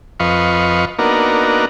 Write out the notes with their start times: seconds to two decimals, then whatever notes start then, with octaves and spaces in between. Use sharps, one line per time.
0.20 F2 B4 D#5 F5 C#6
0.99 A#3 B3 D4 D#4 F#4 A#4